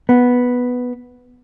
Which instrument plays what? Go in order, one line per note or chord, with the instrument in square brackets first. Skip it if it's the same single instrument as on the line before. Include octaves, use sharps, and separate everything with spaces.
[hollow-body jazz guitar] B3